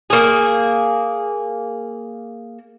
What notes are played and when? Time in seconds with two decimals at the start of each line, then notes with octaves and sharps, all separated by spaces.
0.10 A#3 G#4